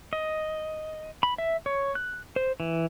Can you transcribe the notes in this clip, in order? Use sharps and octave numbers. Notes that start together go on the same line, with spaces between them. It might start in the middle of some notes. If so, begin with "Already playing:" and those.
D#5
B5
E5
C#5
F#6
C5
E3